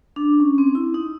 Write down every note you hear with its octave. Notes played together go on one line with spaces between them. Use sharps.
D4
C#4
C4
E4
D#4